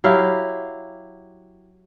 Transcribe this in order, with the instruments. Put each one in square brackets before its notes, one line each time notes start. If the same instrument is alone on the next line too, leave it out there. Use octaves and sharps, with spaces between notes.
[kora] F#3 E4 G4 F5